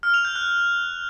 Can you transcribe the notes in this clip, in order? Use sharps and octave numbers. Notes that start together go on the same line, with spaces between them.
F6
F7
G6
F#6